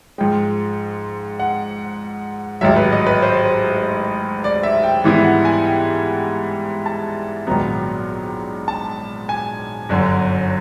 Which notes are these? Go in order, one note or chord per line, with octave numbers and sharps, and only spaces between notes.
G#2 F3 G#3 G5
F#5
A1 G#2 D#3 F#3 E5
B4
D#5
B4
C5
D5
E5
G5
G#2 E3 G3 B3 E4
F#5
G#5
G5
A5
A#1 G#2 D#3 F#3 B3 A#5
A5
G#5
G1 F#2 D3 F#3